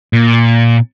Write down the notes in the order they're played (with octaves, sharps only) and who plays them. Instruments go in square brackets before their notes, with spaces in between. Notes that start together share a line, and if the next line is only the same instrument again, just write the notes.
[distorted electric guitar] A#2